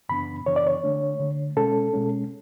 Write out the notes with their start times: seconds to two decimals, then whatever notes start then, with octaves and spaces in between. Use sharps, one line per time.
0.09 F#2 C#3 E3 B3 D4 B5
0.46 F#2 C#3 E3 B3 D4 C#5
0.56 D5
0.67 C#5
0.84 D3 A3 D4
1.20 D3 A3 D4
1.56 B2 G#3 C#4 A4
1.93 B2 G#3 C#4